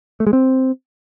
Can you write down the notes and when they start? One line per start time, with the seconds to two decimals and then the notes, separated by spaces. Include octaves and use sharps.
0.20 A3
0.27 G#3
0.33 C4